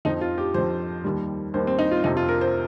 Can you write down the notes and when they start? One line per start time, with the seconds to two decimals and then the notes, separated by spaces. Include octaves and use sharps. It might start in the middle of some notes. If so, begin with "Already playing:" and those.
0.05 F2 F3 D#4
0.21 F4
0.38 G4
0.54 F2 F3 C5
1.04 D#2 D#3 G3
1.54 D#2 D#3 G3 C5
1.67 C4
1.79 D#4
1.91 F4
2.04 F2 C3 F3 D#4
2.17 F4
2.29 A#4
2.41 C5